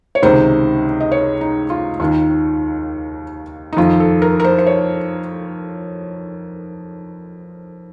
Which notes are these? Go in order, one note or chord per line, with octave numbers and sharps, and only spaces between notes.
C#5
C#2 C3 D#3 C5
D#5
C#5
D#4
F4
D#2 D#3 F4
D#4
F2 D#3 F4
A4
A#4
A#4
C5
C5
C#5